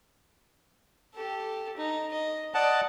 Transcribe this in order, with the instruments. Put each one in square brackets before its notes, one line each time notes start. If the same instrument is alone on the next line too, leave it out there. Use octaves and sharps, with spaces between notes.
[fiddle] G4 A4
D#4
D#5
[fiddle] D5 [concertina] D#5 F#5 A5